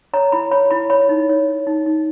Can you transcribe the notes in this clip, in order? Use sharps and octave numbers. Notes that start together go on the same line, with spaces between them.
C#5 A#5
E4 B5
C#5 B5
E4 B5
C#5 B5
D#4
C#5
C#5
D#4
D#4